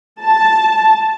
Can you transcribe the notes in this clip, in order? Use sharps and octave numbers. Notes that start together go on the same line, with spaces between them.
A5